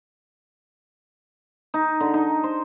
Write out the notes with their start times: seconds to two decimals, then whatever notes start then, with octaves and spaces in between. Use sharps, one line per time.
1.74 D#4
2.00 D3
2.14 D#4
2.44 C5